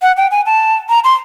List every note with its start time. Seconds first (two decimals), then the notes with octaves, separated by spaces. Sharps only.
0.02 F#5
0.17 G5
0.31 G#5
0.46 A5
0.89 A#5
1.04 C6